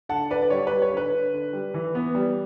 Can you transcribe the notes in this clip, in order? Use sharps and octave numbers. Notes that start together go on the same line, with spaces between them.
D3 F#5 A5
D3 B4 D5
D5
G3 C#5
G3 B4
C#5
D3
B4
D3
D3
G3
E3
B3
G3